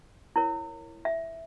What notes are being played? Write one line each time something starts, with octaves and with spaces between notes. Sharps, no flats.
E4 A#4 C#5
E5